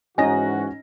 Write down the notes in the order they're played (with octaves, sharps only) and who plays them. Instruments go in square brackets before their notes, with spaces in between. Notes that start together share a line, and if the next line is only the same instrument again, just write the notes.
[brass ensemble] G#2 E3 F#4 [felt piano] C#4 A#6 [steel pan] D#4 D#5 [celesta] G#5